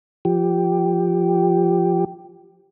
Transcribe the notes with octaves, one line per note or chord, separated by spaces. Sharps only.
F3 G4